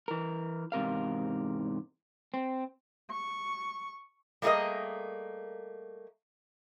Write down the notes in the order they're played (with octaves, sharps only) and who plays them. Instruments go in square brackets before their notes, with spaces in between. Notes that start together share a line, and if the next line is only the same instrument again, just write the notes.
[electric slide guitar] E3 A#4
E2 G#2 C3 A#4 F5
C4
[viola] C#6
[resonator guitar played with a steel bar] G3 A3 A#3 G#4 A#4 D#5